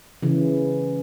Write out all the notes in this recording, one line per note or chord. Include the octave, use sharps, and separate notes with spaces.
C#3 E3